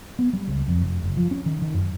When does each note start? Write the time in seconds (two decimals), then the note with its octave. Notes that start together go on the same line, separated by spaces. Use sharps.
0.19 B3
0.33 G3
0.48 C#2
0.68 F2
0.81 F1
1.03 F#1
1.17 F3
1.31 C#4
1.46 D#3
1.62 D#3
1.74 F#2